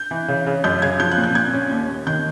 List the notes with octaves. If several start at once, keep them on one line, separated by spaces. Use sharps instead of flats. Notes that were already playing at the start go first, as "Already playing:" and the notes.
Already playing: G6
E3
C#3
C#3
F#2 G6
C#3 G#6
F3 G6
F#6
A#2
G6
A#2 G#6
C#4
D#2
D#2
D#3 G6